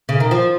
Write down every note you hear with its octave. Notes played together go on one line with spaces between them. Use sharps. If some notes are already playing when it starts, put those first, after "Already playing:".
C#3
D#3
F3